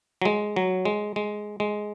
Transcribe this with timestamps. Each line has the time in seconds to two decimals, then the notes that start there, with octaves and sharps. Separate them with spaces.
0.22 F#3
0.25 G#3
0.56 F#3
0.85 G#3
1.16 G#3
1.60 G#3